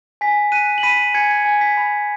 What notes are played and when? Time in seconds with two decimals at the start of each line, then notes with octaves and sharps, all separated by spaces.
0.21 G#5 B6
0.52 F#6 B6 D#7
0.78 F#7
0.83 B5 B6 D#7
1.14 G#5 G#6 C#7
1.45 G#5
1.61 B6
1.77 B5